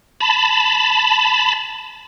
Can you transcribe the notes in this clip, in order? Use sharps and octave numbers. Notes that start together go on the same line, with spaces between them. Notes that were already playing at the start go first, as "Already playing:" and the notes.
A5 B5